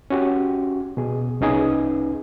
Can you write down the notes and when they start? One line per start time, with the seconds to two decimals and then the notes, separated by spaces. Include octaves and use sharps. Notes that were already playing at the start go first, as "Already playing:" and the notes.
0.10 C#4 F#4 G4
0.97 B2 G#4
1.41 C2 C#4 D#4 G#4 B4